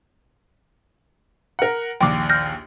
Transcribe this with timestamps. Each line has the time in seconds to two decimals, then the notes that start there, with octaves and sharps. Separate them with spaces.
1.59 A#4 F#5
2.01 A#1 D#2 G5 D6
2.29 F6 G6 A#6